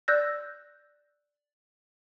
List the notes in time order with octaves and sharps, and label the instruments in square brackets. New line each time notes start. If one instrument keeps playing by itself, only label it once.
[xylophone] D5 E6 F#6 G6 A#6